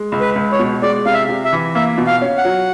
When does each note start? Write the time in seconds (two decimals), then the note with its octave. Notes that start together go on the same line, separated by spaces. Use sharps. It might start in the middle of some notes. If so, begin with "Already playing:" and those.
Already playing: G#3
0.12 C#2
0.21 B4
0.36 C#2
0.52 C#5
0.59 B2
0.82 G#3 D5
1.06 C3 F5
1.14 E5
1.29 C3
1.45 E5
1.53 E3
1.75 A#3 E5
1.98 B2
2.07 F5
2.22 C#4
2.38 F#5
2.45 F#3